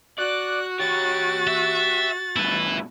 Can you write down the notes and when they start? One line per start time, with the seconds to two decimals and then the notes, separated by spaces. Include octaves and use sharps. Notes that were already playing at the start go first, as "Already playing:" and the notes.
0.18 F#4 D5 F#6
0.79 G4 C#5 A6
1.47 E5
2.36 G2 B2 E4 B4